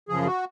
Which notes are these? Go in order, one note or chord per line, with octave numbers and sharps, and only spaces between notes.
F#2 C#3 F3 G#4
F#4